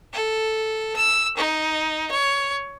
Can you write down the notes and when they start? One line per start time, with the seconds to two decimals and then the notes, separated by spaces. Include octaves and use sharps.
0.13 A4
0.96 E6
1.37 D#4
2.11 C#5